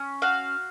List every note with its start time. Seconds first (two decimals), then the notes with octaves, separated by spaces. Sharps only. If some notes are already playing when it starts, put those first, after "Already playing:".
Already playing: C#4
0.22 F#4 F5